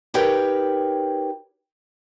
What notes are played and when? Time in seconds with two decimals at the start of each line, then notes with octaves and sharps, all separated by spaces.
0.14 D#4 G4 A#4 B4 C#5 G5